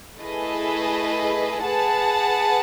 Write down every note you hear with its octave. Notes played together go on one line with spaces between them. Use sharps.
A3 E4 G#4 B4 D#5
G#4 B4 F#5 A5